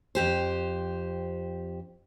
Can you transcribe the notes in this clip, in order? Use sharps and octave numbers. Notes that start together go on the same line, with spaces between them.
F2 G4 C5